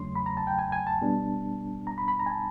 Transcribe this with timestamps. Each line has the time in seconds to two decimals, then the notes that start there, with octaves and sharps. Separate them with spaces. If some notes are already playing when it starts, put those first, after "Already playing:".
Already playing: E2 C#3 F#3 A3 C#4 C6
0.16 B5
0.26 A#5
0.37 A5
0.47 G5
0.59 G#5
0.72 G#5
0.87 A5
1.02 B2 G3 B3 D4
1.87 A#5
1.98 B5
2.08 B5
2.20 A#5
2.26 G#5
2.30 A5